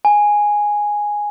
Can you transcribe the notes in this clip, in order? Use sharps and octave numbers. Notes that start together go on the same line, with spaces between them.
G#5